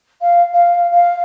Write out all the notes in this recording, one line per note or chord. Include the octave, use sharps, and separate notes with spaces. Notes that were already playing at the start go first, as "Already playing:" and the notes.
F5
F5
F5